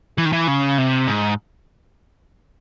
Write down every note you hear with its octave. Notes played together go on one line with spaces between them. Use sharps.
E3
D#3
E3
C#3
C3
G#2